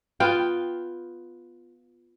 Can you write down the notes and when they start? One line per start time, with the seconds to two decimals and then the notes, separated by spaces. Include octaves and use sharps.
0.20 B3 F4 G5